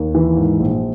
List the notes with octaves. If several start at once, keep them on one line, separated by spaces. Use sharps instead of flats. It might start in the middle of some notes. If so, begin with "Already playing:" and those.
Already playing: D#2
E3
G#2
A#1